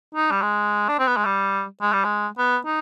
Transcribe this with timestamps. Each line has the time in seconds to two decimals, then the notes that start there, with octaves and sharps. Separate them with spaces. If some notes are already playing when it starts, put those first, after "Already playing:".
0.14 D#4
0.31 G3
0.42 G#3
0.88 D4
0.99 C4
1.07 B3
1.17 G#3
1.25 G3
1.82 G#3
1.93 G3
2.05 G#3
2.38 B3
2.65 D#4